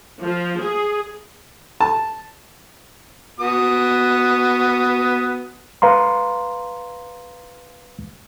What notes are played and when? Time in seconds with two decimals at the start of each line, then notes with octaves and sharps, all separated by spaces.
0.22 F3
0.56 G#4
1.81 A5
3.40 B3 F#4 D#6
5.82 B4 F5 A#5 C6